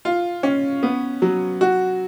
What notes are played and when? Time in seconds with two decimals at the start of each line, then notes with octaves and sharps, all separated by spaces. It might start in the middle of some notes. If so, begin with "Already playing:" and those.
0.05 F4
0.43 C#4
0.83 B3
1.22 F#3
1.61 F#4